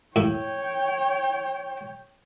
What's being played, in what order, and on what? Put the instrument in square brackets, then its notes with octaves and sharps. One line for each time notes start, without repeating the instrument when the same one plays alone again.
[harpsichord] A2 [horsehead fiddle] C#5 G5